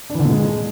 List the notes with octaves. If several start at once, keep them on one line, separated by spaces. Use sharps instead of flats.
D4
E3
D3
A#2
G#3